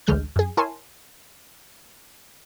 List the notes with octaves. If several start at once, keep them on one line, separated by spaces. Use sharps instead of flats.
A1 D2 D3 G#3 F6 G6
F#2 G#4
E4 A#4 C#5 G#5 A5 C6